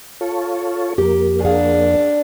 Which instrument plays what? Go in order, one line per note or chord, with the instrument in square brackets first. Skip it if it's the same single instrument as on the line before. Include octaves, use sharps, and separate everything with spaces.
[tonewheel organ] F4 A4 C#5
[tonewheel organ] F2 A#3 [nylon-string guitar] G4
[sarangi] D4 [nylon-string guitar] G#4 F5 F#5